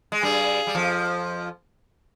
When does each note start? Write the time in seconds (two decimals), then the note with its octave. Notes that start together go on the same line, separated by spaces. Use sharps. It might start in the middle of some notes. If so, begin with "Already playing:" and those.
0.12 G#3
0.22 G2 G3 G#4
0.67 G3
0.75 F2 F3